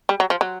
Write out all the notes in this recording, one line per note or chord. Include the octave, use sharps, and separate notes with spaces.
G3
F#3
F3
F#3